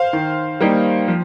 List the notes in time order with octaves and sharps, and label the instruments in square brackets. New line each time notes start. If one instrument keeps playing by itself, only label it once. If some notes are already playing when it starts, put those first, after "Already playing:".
Already playing: [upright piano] C5 F5
D#3
G3 A#3 D#4
F3